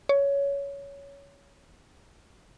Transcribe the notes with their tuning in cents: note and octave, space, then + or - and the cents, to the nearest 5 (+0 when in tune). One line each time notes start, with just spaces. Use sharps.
C#5 +15